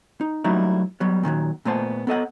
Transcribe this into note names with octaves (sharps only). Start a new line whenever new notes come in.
D#4
F#3 G3 A3 A#3 D#4 E4
F#3 G3 B3
A#2 D#3 E3 F#3
A#2 A3 B3 C5 A5
B3 A4 D#5 F#5